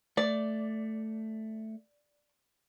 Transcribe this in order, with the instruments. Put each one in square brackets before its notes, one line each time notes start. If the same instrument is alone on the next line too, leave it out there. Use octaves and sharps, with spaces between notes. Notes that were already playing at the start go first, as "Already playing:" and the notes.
[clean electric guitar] A3 [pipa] D5